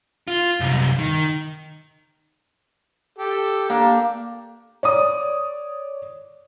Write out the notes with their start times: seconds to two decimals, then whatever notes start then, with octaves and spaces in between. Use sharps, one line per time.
0.28 F4
0.60 C2 F#2
0.99 D#3
3.18 G4 A4
3.69 A#3 D4 G4
4.83 C#5 D5 D#6